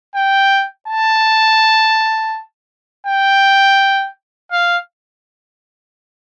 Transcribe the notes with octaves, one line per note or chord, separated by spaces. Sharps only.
G5
A5
G5
F5